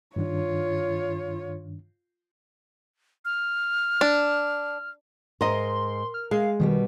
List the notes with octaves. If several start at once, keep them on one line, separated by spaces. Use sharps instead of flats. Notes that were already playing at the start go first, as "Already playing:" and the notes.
G2 D#3 D4 F4 C#5
F6
D4
G#2 A#4 D#5 C6
F6
G#3 F5
B2 D#3 G3 B3